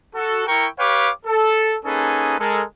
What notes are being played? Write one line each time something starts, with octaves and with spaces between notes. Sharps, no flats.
F#4 A4
E4 A#4 G5 A#5 C#6
G4 B4 C#5 F5 G5 D6
A4
A#3 C#4 D#4 G#4 A4 B4
G#3 A4 A#4